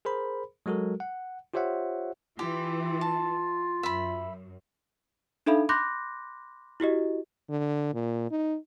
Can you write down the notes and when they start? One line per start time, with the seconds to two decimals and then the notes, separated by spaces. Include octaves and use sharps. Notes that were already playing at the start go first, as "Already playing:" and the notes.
0.05 G#4 A#4 C5 B5
0.66 F#3 G#3 F#4 A4 A#4
1.00 F#5
1.54 F4 G4 C5 C#5 E5 F#5
2.39 E3 F4 G4
3.01 A5
3.83 F#2 E5 B5
5.46 D4 D#4 A4 E5 F5 B5
5.69 B5 C6 D6 F#6 G6 A#6
6.80 E4 F#4 G4 D#5
7.49 D3
7.94 A#2
8.31 D#4